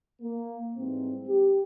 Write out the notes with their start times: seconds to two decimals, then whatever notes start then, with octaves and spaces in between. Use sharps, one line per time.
0.21 A#3
0.75 G#2 E3 G3 C4
1.27 G4